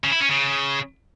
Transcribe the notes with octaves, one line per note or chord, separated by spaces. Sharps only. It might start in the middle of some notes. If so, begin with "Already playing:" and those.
C#3
E4
C#4
C#3